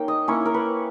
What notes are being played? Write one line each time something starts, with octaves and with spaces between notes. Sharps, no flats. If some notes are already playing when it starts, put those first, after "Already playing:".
Already playing: A#3 C#4 D#4 G5
D#5
A#3 C#4 E4 C#5
A#4
B4